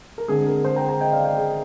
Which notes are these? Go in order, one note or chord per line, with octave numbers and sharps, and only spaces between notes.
A#4
D3 G#3 C4 G#4
A#4
G#4 C5
G5 A#5
G5 A#5
D#5 G5
D5 F5
D#5 G5
G#4